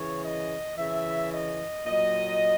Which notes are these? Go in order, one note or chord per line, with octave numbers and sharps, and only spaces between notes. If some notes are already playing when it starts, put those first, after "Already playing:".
Already playing: C#3 E3 C#5
D#5
C#3 E3 E5
D#5
A#2 F#3 D#5